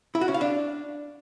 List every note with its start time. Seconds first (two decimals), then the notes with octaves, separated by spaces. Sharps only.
0.15 E4
0.21 F#4
0.28 C#4
0.34 F5
0.41 D4